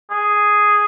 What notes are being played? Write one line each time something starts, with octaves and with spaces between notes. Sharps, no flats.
G#4